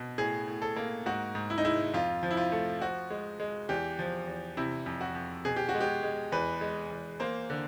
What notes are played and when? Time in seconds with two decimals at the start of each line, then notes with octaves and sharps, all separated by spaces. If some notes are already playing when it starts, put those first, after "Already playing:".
Already playing: B2
0.18 A2 G#4
0.48 A2
0.62 A4
0.76 A#3
1.06 G#2 F#4
1.35 G#2
1.50 E4
1.58 D#4
1.65 G#3 E4
1.94 F2 F4
2.23 F3
2.31 E4
2.37 F4
2.52 A3
2.81 F3 F#4
3.10 G#3
3.40 G#3
3.69 E2 G4
3.99 F3
4.28 E2
4.57 C3 E4
4.86 F2
5.01 F#4
5.15 F2
5.45 B2 G#4
5.57 G4
5.69 F#4
5.74 G#3
5.81 G4
6.03 G#3
6.32 E2 B4
6.61 G#3
6.91 E2
7.20 A#3 C5
7.50 D3